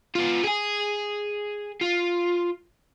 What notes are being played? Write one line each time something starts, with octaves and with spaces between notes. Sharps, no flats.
B3 F4
G#4 G#5
F4